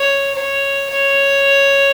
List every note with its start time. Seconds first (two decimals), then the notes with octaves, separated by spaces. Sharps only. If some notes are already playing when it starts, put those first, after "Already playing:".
Already playing: C#5
0.35 C#5
0.90 C#5